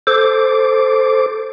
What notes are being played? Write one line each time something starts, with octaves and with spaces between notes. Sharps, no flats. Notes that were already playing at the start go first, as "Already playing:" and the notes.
A4 C5 D6